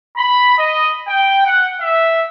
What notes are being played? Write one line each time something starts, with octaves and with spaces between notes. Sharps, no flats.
B5
D#5
G5
F#5
E5